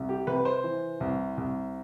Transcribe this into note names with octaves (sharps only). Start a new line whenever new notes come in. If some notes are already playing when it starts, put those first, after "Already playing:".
Already playing: C2
G4
C3 B4
C5
E3
C2
C2